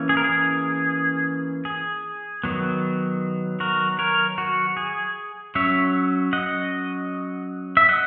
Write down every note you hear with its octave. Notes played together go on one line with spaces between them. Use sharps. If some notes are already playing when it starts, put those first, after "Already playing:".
Already playing: E3 A#3 C#4
G#4
A#4
G#4
G#4
D#3 F#3 B3
F#4 A#4
A#4 C#5
F#4
G#4
F#3 C#4 C#5 E5
D#5 F#5
E5
D#5 F#5